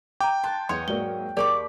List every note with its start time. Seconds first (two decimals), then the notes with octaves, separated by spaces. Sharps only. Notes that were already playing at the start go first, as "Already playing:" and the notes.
0.21 G5 A#5 D6
0.44 A5 C6 F#6
0.69 E2 C#5 D#5 C6 C#7
0.88 G#2 F#3 A#3 D5 G7
1.37 D#2 G4 G#4 A#4 D5 B5 C#6 D6